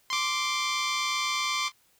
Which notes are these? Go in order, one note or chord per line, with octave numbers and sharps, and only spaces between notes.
C6 D6